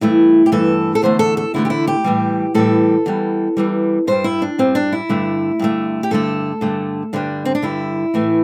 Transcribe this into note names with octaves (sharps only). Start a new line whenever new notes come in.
G2 E3 A3 E4
G4
G2 E3 A3 A4
A4
E2 D3 A3 C5
A4
A4
E2 D3 A3 E4
G4
E4
G4
A2 E3 G3
A2 E3 G3 A4
E2 E3 G3
E2 E3 G3
G2 G3 C5
E4
D4
G2 G3 C4
D4
E4
G2 D3 A3
G2 D3 A3
G4
G2 D3 A3 A4
G2 D3 A3
G2 D3 G3 D4
C4
D4
G2 D3 G3 E4
A2 E3 A3